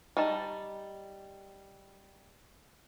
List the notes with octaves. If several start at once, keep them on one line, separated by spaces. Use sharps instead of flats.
G3 D#4 A5